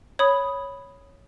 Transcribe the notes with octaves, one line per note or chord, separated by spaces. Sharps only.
C#5 B5 D#6